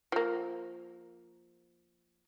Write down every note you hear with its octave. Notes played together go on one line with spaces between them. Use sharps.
F3 A#3